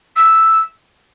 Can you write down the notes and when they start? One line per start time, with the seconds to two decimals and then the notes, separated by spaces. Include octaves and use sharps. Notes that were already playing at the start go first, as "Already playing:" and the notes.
0.16 E6